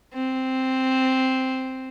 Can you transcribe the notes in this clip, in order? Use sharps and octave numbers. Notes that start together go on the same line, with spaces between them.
C4